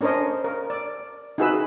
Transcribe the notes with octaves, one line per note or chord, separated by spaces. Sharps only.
C#4 D4 A#4 C5 C#5 D#5
A#4
D5
D#4 E4 F#4 G#4 B4 E6